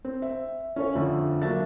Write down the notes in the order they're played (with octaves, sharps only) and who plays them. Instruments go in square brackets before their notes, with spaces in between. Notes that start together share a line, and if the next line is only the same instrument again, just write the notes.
[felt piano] C4
E5
C#4 A4 C#5
F2 D3 A3
F#3 A#3 D4 E5 A6